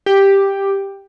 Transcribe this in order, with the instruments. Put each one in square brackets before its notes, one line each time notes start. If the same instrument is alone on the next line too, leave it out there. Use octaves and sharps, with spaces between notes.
[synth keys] G4